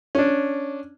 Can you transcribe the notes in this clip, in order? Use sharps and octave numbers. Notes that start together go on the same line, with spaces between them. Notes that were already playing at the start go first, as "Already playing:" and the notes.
C#4 D4